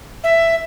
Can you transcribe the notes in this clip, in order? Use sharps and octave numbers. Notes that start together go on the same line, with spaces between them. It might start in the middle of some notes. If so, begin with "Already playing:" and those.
E5